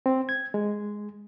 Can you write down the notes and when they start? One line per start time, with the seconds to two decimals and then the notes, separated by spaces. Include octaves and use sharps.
0.06 C4
0.29 G#6
0.54 G#3